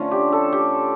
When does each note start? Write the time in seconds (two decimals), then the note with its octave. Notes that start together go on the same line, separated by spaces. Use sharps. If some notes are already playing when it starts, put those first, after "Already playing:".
Already playing: D3 F3 A3 C#4 F4
0.11 G4
0.32 A4
0.53 G4